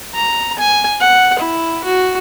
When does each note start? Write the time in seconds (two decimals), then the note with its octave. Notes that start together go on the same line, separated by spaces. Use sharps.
0.15 A#5
0.59 G#5
1.00 F#5
1.39 E4
1.84 F#4